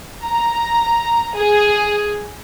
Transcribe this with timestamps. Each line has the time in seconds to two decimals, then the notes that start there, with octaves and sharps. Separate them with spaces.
0.23 A#5
1.35 G#4